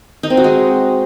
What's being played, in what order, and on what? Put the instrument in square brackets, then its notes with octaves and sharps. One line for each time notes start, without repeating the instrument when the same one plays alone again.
[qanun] D#4
C4
F#4
G#3